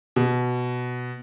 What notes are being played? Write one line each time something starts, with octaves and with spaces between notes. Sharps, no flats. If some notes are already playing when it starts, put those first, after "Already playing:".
B2